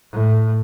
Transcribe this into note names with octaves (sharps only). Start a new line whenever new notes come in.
A2